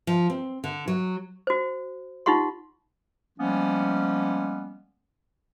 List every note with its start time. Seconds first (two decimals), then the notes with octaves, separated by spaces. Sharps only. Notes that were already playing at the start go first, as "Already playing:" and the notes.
0.07 F3
0.30 C4
0.64 D3
0.88 F#3
1.47 F#4 C5
2.26 D#4 F4 G4 F#5 C6
3.39 F3 G3 G#3 A#3 B3 C#4